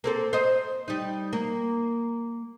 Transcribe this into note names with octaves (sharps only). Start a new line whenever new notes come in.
A#3 C4 A4
C5 D#5
G3 D#4
A#3